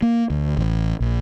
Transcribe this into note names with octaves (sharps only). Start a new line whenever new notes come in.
A#3
D2
A1
A#1